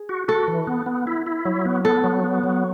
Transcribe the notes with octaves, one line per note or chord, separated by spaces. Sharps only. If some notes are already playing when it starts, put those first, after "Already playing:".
Already playing: G#4
F#4
F#4 A4
E3
B3
B3
E4
E4
F#3
B3
B3 A4
F#3
B3
F#3